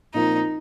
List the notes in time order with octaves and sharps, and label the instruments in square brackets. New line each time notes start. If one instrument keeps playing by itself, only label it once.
[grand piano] A#2 F3 C4 F4 A#4 [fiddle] D#4